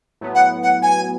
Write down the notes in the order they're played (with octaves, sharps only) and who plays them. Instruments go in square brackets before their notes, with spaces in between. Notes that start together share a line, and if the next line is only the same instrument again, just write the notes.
[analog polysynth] A2 F#3 B3
[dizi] F#5
F#5
G#5